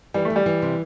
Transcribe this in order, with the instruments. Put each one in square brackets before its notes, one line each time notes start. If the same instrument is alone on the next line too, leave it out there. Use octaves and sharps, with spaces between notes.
[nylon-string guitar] E3 [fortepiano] G3
[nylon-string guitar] E3 [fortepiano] A3
[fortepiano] G3
[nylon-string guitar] E3
C3